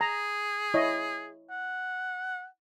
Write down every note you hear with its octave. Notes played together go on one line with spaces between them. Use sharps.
G#4 A#5
E4 C#5 D#5
F#5